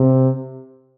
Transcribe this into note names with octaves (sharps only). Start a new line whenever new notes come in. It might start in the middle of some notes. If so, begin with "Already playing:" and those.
Already playing: C3